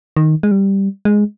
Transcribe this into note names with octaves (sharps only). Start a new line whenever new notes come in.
D#3
G#3
G3
G#3